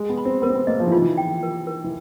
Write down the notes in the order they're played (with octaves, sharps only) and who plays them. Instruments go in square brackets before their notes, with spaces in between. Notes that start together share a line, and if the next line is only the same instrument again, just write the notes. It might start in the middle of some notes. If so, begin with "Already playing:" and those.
Already playing: [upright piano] G#3
B3
[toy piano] B5
[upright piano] C4
[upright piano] B3 [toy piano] A#4
[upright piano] C4
B3
[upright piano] A#3 [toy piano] D#5
[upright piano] F3
E3
[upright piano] D#3 [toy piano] F4
[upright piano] E3
[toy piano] G5
A#4
A#4
[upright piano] E3